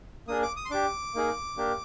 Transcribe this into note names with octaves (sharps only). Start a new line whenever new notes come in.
A#3 D4 G#4 D#6
D6
D#6
C6
D4 G4 D6
A#3 D#4 G#4
A#3 D4 G4